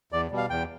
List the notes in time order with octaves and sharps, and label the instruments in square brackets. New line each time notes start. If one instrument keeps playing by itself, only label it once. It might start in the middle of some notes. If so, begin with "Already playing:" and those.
[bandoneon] E2 D5
B2 G3
F5
E2 G5